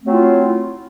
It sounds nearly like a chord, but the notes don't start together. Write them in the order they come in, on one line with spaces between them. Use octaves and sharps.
A3 C4 F#3 F4 E4